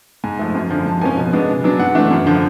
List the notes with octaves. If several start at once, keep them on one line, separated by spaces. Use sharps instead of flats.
G#2 G#5
F3 A3
F#2
D3 F3
G#2 A5
F3 A#3 C#4 G#5
B2
G#3 B3 D4
C#3
F#3 B3 D4
G#2 F#5
E3 A3 D4
F#2
D3 F3